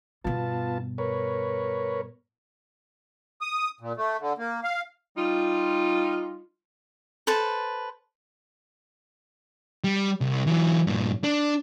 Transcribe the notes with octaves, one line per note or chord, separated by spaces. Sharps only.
G2 B2 B3 F4 A5
A#4 B4 C#5
D#6
A#2
A3
D3
A#3
F5
G3 D#4 F4
A4 B4 C5 A5
G3
C2
E3 F#3
G2 A#2
D4